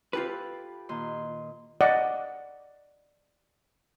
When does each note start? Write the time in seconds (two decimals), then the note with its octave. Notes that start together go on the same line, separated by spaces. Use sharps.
0.13 F4 G4 A4 B4
0.89 A#2 D#3 C6
1.81 D5 D#5 F#5